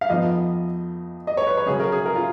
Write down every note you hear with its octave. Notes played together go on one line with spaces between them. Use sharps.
F5
F2 F3 B3 D#4 D#5
D#5
C#5
B4
C#5
C#3 F#3 C#4 G#4
A#4
G#4
A#4
F4